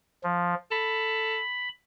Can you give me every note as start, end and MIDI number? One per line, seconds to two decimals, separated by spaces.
0.24 0.55 53
0.71 1.40 69
0.71 1.69 83